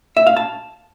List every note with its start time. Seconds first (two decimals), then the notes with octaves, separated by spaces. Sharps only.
0.17 E5
0.27 F5
0.37 A5